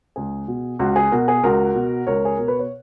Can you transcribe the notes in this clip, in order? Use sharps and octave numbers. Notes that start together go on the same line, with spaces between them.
C#2 G#4
B2
C#2 F#4
G#4
B2 F#4 A#4
G#4
C#2 F#4 A#4
B2
C#2 A#4 C#5
G#4
B2 A#4
B4
C#5